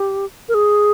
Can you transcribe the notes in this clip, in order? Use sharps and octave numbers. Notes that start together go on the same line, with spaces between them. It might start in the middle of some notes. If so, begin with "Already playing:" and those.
Already playing: G4
A#4
G#4